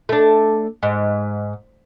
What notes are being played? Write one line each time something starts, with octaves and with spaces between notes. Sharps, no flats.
A3 D4
G#2